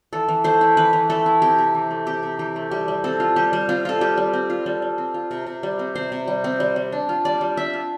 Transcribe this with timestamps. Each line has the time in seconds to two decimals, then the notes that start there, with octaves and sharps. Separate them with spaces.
0.13 E3 A4
0.28 E3
0.44 A3 C5
0.61 E4
0.77 E3 B4
0.93 E3
1.10 A3 A4
1.26 E4
1.42 C4 G4
1.58 C3
1.75 E3
1.91 A3
2.06 C4 G4
2.23 C3
2.39 E3 G4
2.56 A3
2.71 G3 G4
2.88 G3
3.04 C4 A4
3.20 F4
3.36 G3 G4
3.53 G3
3.69 C4 F4
3.85 F4 A4
4.01 G3 G4
4.17 G3
4.33 C4
4.50 F4
4.66 G3 A4
4.82 G3
4.98 C4
5.14 F4
5.31 C3
5.47 C3
5.63 G3
5.79 C4
5.95 C3 C5
6.12 C3
6.28 G3
6.44 C4
6.60 G3
6.76 G3
6.92 D4
7.09 F4
7.25 G3 D5
7.41 G3
7.57 D4 E5
7.73 F4